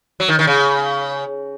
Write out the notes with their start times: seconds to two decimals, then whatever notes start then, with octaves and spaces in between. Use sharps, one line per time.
0.20 F#3
0.28 D#3
0.39 D#3
0.47 C#3